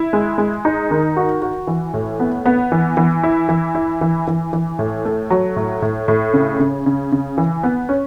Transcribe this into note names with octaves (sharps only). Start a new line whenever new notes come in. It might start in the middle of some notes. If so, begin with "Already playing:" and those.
Already playing: E4
G#3
G#3
D#4
D#3
F#4
F#4
E3
A2
B3
B3
E3
E3
E4
E3
E4
E3
E3
E3
A2
A3
F#3
A2
A2
A2
C#3
C#3
C#3
C#3
E3
B3
C#4